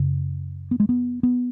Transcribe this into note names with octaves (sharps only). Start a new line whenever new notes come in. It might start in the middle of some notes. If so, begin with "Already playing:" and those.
Already playing: F#2 C#3
B3
G#3
B3
B3